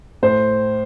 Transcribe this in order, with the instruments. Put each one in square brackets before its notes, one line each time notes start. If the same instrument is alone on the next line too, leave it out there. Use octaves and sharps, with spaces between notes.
[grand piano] A2 C5